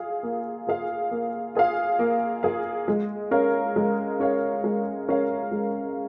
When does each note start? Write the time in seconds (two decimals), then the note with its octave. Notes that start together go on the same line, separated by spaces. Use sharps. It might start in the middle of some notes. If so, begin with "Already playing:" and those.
Already playing: F4 G#4 F5
0.23 A#3
0.67 F4 G#4 F5
1.11 A#3
1.55 F4 G#4 F5
1.99 A#3
2.43 F4 G#4 F5
2.88 G#3
3.31 C#4 A#4 C#5 F5
3.76 G#3
4.19 C#4 A#4 C#5 F5
4.64 G#3
5.08 C#4 A#4 C#5 F5
5.52 G#3